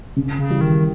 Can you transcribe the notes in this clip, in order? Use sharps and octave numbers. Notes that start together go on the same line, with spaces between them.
C#3
C#3
E3 G3
D#3